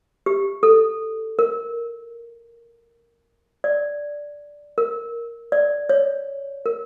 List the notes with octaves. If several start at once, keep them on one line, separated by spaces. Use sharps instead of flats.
G4
A4
A#4
D5
A#4
D5
C#5
A#4